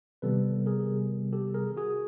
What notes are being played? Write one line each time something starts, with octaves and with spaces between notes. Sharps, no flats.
C3 D#3 G3 B3 A4 B4
G#4 A#4
G4 A4
G#4 A#4
F#4 G#4